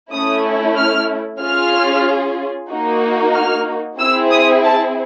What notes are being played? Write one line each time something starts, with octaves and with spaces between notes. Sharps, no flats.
A3 C#4 E4 D#6
F6
C#4 F4 G#4 F6
A#3 D#4 F#4
F6
C4 E4 G#4 E6
D#6
A5